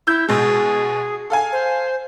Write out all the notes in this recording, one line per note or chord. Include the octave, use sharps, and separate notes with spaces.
E4 E6 G6
B2 G#3 G#4
A4 F5 G#5
C5